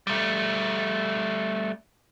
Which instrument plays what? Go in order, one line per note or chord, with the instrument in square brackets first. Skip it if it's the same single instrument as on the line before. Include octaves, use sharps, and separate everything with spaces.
[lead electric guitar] G3 A3